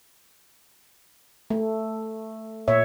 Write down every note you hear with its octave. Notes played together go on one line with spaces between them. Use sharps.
A3
A#2 C#5 E5